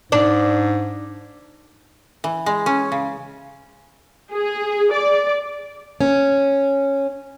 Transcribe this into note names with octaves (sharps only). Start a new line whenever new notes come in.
G#2 D4
E3
G#3
C#4
C#3
G#4
D5
C#4